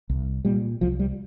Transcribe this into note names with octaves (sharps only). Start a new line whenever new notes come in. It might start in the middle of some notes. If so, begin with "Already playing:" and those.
C2
A#2 G3
C2 F3
G3